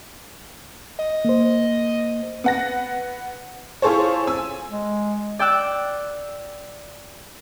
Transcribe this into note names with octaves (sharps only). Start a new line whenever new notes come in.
D#5
A#3 C5
B3 F#5 A#6
E4 F4 G#4 A4 C5 C#5
G#5 E6
G#3
D5 G5 D6 E6 F#6 G6